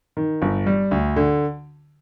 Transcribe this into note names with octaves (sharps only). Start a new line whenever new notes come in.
D#3
G1
G3
D2
D3